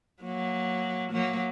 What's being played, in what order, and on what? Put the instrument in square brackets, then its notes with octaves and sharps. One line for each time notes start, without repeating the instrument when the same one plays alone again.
[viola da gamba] F#3 A#3
F#3 A#3